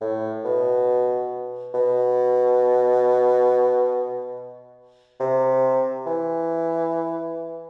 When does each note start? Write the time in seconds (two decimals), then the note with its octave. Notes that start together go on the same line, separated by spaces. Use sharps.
0.01 A2
0.45 B2
1.74 B2
5.20 C3
6.06 E3